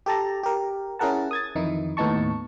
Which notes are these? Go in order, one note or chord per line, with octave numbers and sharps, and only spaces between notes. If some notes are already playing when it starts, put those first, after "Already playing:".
G4 A4 A5 A#5
G4 A#4
C#4 E4 G#4 A#4 F#5 A5
D#6 G#6 A6
F2 D#3 E3 D#4 E4
D#2 A2 B3 D#4 A5 C#6